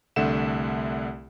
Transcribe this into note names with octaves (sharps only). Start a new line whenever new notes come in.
C2 D3 A3 E5 F#5 E7